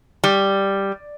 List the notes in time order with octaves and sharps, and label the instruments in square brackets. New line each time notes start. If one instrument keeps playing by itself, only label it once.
[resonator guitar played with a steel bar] G3